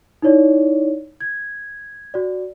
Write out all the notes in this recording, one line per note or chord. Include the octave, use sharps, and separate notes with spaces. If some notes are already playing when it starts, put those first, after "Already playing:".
D#4 E4 C#5 D5
G#6
F#4 D5